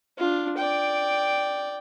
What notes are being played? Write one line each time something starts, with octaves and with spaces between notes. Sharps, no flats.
D4 F4
D5 G5